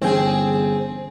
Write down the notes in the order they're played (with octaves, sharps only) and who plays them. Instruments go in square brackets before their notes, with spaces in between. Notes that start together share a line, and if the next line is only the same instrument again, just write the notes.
[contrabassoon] G1 [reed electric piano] E3 C#4 G5 [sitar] C4 G#4